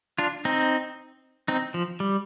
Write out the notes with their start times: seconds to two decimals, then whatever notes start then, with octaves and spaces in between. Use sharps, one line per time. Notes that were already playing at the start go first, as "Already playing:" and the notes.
0.18 D4 F4
0.45 C4 D#4
1.48 C4 D#4
1.74 F3
2.00 G3